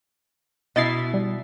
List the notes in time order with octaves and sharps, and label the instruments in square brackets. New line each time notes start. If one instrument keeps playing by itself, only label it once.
[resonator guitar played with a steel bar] B2 E4 [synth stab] D#5 A6 C7
[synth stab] G3